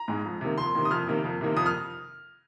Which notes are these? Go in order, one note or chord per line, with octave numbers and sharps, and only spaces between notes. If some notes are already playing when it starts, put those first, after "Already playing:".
Already playing: A#5
G#2 G#3
F2
C3 D#3 A#3
F2 C6
C3 D#3 A#3
D#6
F2 F6
C3 D#3 A#3
F2
C3 D#3 A#3
F2 D#6
F6